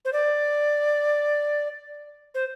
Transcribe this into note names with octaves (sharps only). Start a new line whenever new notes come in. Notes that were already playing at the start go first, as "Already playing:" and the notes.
C5
D5
C5